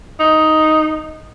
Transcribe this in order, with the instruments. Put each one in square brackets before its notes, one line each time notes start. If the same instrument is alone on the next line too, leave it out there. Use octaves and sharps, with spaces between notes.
[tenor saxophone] D#4